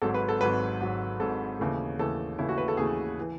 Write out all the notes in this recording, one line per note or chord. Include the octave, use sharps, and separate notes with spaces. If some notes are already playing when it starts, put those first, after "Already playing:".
G#1 G#2 F#3 A4
B4
A4
G#1 G#2 F#3 B4
G#1 G#2 F#3
G#1 G#2 F#3 A4
D#2 C#3 E3 A3
D#2 C#3 E3 A3 A4
D#2 C#3 E3 A3 E4
F#4
B4
A4
D#2 C#3 E3 A3 G#4
E3